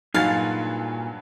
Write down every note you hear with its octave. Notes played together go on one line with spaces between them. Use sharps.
G2 A#2 F#3 D#4 G#4 F5 A6